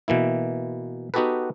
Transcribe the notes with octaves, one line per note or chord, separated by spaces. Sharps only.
B2 E3 A#3 E4
B3 D#4 F#4 G4 A4 B4